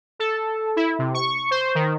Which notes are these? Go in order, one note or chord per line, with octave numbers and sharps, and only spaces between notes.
A4
E4
C3
C#6
C5
D#3